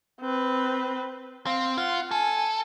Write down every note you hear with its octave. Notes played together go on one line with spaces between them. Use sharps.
C4 B4
C4 F5
F4 F#5
A4 G#5